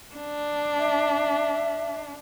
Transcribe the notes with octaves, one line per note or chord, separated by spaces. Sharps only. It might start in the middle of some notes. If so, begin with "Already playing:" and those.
D4
E5